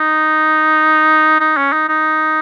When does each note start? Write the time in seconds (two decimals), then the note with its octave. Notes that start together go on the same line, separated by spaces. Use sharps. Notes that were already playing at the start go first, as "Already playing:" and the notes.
Already playing: D#4
1.40 D#4
1.57 C#4
1.72 D#4
1.89 D#4